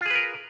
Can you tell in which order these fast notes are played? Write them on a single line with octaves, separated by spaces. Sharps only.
F4 G#4 B4 A#4